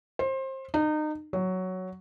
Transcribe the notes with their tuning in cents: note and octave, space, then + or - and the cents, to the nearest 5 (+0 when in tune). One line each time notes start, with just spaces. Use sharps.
C5 +25
D#4 -30
F#3 +5